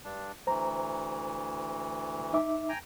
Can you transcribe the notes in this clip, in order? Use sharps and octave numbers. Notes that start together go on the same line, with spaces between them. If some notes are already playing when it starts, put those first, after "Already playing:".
G2 D4
D2 E3 C5 A#5
D#4 E5 D6
G5 G#5 A#5